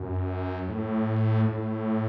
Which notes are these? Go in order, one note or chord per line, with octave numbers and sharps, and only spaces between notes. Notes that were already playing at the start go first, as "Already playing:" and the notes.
Already playing: F#2
A2
A2